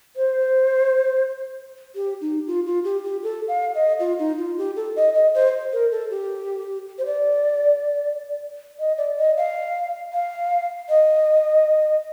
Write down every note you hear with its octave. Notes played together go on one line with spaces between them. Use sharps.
C5
G4
D#4
F4
F4
G4
G4
A4
F5
D#5
F4
D#4
F4
G4
A4
D#5
D#5
C5
A#4
A4
G4
C5
D5
D#5
D5
D#5
F5
F5
D#5